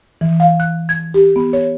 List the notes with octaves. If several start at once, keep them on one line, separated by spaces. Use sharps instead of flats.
E3
F5
F#6
G#6
G4
B3
C#5